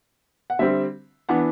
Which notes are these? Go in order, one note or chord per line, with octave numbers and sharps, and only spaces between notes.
F#5
D3 G3 C4 E5
E3 B3 D4 F#5